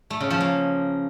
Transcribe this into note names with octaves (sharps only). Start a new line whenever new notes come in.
A3
C#3
F3
A#3